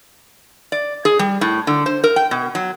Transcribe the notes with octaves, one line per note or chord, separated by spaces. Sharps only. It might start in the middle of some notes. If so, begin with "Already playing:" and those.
D5
G#4
G3
A2
D3
C5
A#4
G5
B2
F#3